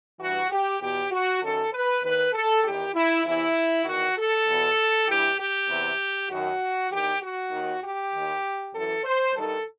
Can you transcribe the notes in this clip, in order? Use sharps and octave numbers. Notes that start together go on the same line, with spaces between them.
G2 E3 F#4
G4
E2 B2 G4
F#4
F#2 D#3 A4
B4
D#2 D#3 B4
A4
E2 D#3 G4
E4
E2 C3 E3 E4
E2 D#3 F#4
A4
E2 B2
G2 E3 G4
G4
E2 C3 E3
F#2 D#3 F#4
E2 D#3 G4
F#4
D#2 D#3
G4
D#2 D#3
F#2 E3 A4
C5
G2 D#3 A4